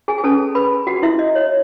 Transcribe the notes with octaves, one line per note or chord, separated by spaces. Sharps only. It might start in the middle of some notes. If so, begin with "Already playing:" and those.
G#4 G#5
G#5
C#4 G#4 A4 B4 A5
B4 B5
F#4 F#5
E4 E5
D#5
C#5